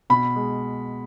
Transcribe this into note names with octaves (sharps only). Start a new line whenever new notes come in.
B2 B5
G#3